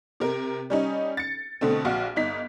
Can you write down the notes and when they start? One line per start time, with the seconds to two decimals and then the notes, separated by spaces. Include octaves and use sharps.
0.20 C3 A#4
0.70 G3 C#4 D#4
1.17 A6 C#7
1.61 B2 D3 A3 C4
1.85 A#1 F#4 F5 F6
2.16 G1 D#4 B6